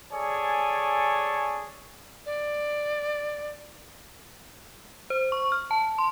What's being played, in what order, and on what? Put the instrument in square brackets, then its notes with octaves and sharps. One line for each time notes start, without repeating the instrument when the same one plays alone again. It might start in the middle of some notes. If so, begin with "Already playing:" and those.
[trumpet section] G#4 A4 C#5 D5 G#5
[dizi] D5
[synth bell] C5
C#6
F6
A5
C6